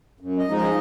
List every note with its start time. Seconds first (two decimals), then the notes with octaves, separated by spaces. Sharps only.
0.21 F#2
0.38 D#5
0.48 F3 G#3 D#4
0.57 D#5